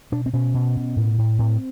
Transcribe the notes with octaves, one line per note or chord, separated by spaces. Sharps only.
B2 D4
C4
B2 C#4
B2
B2
A2
A2
A2 C4